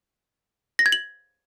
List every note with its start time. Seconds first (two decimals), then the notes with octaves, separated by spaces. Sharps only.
0.79 A#6
0.86 G#6
0.92 F#7